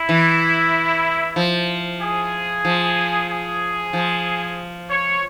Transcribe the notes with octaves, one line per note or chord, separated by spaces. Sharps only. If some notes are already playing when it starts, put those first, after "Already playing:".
Already playing: E4
E3
F3
G#4
F3
G#4
F3
C#5